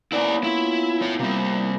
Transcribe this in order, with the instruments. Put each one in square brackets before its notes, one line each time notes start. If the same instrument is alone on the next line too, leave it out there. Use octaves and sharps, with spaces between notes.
[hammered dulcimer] A#3 B3 C#4 [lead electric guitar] E4 D5
[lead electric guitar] E4 [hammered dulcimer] F4
[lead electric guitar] E4 C#5
[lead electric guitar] C3 G3 [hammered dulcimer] A#3 E4